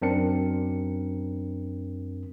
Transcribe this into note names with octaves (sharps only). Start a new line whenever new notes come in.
F#2 C4 D4 A#4 C#7